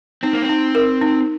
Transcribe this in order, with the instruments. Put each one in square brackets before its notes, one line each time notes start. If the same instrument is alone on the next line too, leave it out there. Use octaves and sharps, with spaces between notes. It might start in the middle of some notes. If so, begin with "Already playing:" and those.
[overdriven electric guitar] C4 [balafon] D#4
[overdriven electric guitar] A#3
C4
[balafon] D#4
A#4
D#4